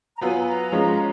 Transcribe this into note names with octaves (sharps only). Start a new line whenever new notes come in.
A#5
F#3 B3 F4 B4 G#5
A#5
F3 G#3 C#4 F4